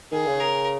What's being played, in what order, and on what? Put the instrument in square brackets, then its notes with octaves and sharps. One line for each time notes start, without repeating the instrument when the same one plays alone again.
[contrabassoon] D#3 [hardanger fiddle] G#4
[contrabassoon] C#3
[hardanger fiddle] A#4